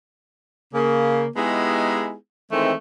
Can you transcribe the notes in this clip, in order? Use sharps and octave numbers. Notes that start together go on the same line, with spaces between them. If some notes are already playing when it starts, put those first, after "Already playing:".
C#3 A#3
G#3 B3 D#4 E4 G4 G#4
D#3 E3 G#3 A3 C4